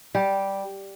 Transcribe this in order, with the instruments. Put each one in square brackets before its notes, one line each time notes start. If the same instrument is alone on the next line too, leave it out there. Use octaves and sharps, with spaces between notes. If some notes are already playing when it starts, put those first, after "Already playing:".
[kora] G3 G4